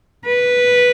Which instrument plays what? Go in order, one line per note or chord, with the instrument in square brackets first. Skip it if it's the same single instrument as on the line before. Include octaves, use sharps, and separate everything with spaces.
[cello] B4